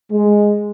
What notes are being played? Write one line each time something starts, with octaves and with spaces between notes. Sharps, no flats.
G#3